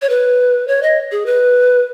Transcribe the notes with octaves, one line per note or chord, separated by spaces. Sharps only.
C#5
B4
C#5
D#5
G#4
B4